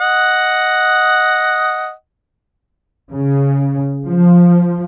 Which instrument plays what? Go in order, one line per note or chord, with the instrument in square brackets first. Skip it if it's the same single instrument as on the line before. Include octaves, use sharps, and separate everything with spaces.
[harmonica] D#5 F#5
[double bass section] C#3
F3